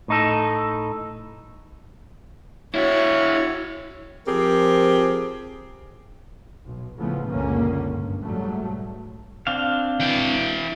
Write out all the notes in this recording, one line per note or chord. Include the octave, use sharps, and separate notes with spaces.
A2 D#4 A4
E4 F#4 C#5
F3 C4 G4 G#4 A#4
B1
A2 C#3 E3 F3 A3 B3
C#2 F#2 A#2 D3 A#3 C#4
G2
G#2 F#3 G3 A3
B1
C4 D4 F5
E3 G5